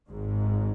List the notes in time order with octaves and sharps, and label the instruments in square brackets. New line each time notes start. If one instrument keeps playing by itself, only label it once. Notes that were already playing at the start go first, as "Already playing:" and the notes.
[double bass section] G#1 G#2